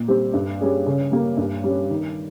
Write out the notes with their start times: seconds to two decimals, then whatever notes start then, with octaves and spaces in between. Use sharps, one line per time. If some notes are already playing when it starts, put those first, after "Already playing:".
Already playing: A#2
0.08 G3 C4 G4
0.34 G2
0.61 G3 C#4 G#4
0.86 C#3
1.11 G3 A#3
1.37 G2
1.64 G3 C#4
1.90 D#3